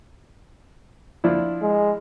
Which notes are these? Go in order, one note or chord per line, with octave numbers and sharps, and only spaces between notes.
F3 D4 E4
G#3